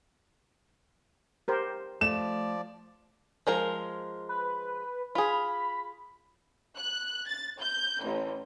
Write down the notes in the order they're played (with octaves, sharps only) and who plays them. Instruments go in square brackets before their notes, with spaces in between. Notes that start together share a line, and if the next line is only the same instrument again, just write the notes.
[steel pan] G4 A#4 C5
[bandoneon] F3 D5 [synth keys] A3 [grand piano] E7
[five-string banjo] F3 G#3 A#4
[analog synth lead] B4
[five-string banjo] F4 G#4 [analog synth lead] B5
[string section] F#6
A6
G6
A1